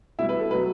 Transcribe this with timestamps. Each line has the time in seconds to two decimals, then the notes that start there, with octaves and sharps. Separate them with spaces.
0.19 B2 G3 E4 E5
0.29 B4
0.39 A4
0.50 B2 F#3 B4